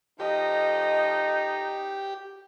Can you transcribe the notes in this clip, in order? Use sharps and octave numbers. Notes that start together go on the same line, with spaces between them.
F3 A3 D#4 G4 D#5